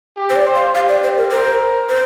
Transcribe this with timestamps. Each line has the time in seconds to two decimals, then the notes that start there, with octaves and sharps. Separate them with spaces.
0.17 G4
0.30 C5
0.36 D5
0.45 C5
0.55 F5
0.74 G4 F5
0.89 D5
1.03 C5
1.17 A#4
1.32 A#4 C5
1.89 C5